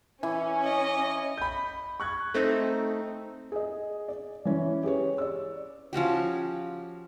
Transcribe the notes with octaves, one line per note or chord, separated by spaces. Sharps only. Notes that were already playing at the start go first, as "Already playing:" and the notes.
E3 C#4
D#5
B5 G6
C#6 F#6 G#6
A3 C4 D#4
G#4 D#5
D5
E3 C#4
G4 G#4 B4 C#5
D5 E6
F3 C#4 F#4 G4